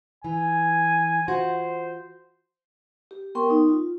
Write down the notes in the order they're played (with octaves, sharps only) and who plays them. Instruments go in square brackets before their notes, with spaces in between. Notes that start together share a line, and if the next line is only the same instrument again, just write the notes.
[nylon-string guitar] E3 [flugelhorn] G#5
[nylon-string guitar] F4 F#4 [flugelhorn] C5
[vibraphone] G4
B3 A#4 G5 C6 C#6
D#4
F4